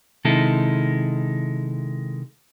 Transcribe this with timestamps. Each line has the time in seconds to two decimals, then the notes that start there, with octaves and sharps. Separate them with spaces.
0.25 C3 D#3 G#3 E4 A4